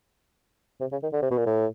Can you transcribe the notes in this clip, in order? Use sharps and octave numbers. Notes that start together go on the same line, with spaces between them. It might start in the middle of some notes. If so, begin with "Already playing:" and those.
C3
C#3
D#3
D3
C3
B2
A#2
A2